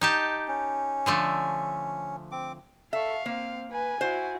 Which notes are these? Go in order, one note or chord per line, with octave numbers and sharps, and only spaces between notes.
D#4 G4 A5
C#4
D3 F3 A3
C4 D6
A4 E5 F5 C#6
A#3 C4
B4 G#5
E4 F#4 C5